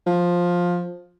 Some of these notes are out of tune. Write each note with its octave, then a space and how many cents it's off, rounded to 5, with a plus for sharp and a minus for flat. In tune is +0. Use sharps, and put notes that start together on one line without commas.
F3 +10